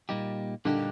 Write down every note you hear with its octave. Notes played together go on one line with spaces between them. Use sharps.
A#2 G3 A#3 D#4 G4
A#2 D3 G3 A#3 D#4 G4